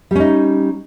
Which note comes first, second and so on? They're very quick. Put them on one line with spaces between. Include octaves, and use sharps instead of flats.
G3 C#4 D#4